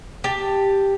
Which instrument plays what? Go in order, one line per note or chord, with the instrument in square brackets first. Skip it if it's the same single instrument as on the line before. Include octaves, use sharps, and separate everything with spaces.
[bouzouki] G4 A5